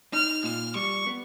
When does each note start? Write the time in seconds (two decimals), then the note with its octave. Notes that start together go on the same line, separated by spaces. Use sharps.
0.13 D#4 F6
0.44 A#2 F6
0.75 G3 C#6
1.07 B3